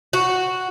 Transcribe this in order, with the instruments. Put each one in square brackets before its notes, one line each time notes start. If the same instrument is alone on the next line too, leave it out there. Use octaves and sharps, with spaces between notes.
[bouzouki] F#4